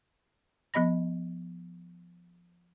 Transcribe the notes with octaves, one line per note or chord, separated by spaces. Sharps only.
F3 B3 D#5 B5 A#6